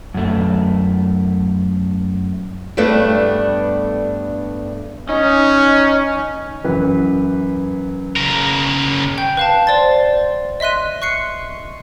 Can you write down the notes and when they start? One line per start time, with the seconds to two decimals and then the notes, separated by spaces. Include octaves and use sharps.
0.14 F#2 A3
2.77 G2 G3 A3 B3 D4
5.09 C#4 D#4 D#5
6.64 F#2 E3 B4
8.16 C#3 A#4
9.18 G5 G6
9.37 B4 F5 A5
9.67 C5 D5 C6 A6
10.60 D#5 E5 C6 F#6 D#7
11.02 C#6 F#6 C7 C#7